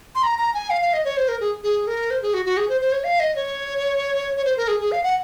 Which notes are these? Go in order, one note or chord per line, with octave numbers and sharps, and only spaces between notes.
C6
A#5
A#5
G#5
F5
F5
D#5
C#5
C5
A#4
G#4
G#4
A#4
C5
G#4
F#4
F#4
G#4
C5
C5
C#5
F5
D#5
C#5
C#5
C5
A#4
G#4
G#4
F5
F#5